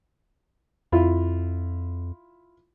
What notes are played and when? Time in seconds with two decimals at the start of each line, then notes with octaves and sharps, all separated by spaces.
0.92 F2 E4 F4